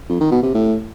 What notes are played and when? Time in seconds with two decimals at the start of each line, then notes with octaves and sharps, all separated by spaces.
0.09 F2
0.20 D#3
0.32 B2
0.43 C3
0.54 A2